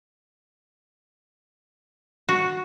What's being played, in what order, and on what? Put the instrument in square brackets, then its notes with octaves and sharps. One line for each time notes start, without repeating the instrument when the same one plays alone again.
[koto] F#4